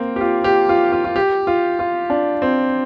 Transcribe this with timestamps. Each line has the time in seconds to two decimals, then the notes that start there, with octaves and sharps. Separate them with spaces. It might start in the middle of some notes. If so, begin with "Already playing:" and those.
Already playing: A#3 C4
0.16 G4
0.21 F4
0.44 G4
0.69 F4
0.92 F4
1.04 F4
1.16 G4
1.47 F4
1.79 F4
2.10 D4
2.42 C4